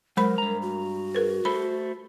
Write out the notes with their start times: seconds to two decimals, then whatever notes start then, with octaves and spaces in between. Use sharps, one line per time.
0.17 F#3 G#3 A#4 C5 B5
0.38 G2 A#5
0.62 F#4
1.15 G#4 A#4 B4
1.45 A3 A4 C5 B5